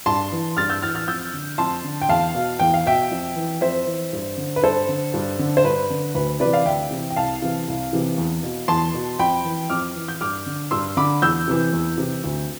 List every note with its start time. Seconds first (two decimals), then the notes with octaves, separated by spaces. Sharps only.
0.06 G2 A5 C6
0.32 E3
0.57 G2 F6 A6
0.69 E6 G6
0.82 E3 F6 A6
0.95 F6 A6
1.08 F2 E6 G6
1.33 D3
1.58 F2 A5 C6
1.84 D3
2.02 G5
2.09 E2 F5 A5
2.35 B2
2.60 E2 G5
2.74 F5
2.86 B2 E5 G5
3.11 F2
3.36 E3
3.61 F2 C5 E5
3.86 E3
4.13 G2
4.38 D3
4.56 B4
4.62 G2 A4 C5
4.89 D3
5.14 G2
5.39 D3
5.57 C5
5.64 G2 B4
5.90 D3
6.15 D2 B4
6.40 C3 E3 B4 D5
6.53 D5 F5
6.65 D2 E5 G5
6.91 C3 E3
7.10 G5
7.16 C2 F5 A5
7.42 C3 E3
7.68 C2
7.93 C3 E3
8.18 E2
8.43 B2
8.68 E2 A5 C6
8.94 B2
9.19 F2 G5 B5
9.45 E3
9.70 F2 D6 F6
9.96 E3
10.08 G6
10.21 G2 D6 F6
10.46 D3
10.71 G2 C6 E6
10.97 D3 B5 D6
11.22 E2 E6 G6
11.48 C3 E3
11.73 E2
11.98 C3 E3
12.24 D2